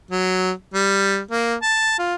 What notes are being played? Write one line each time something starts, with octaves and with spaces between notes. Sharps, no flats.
F#3
G3
A#3
A5
F4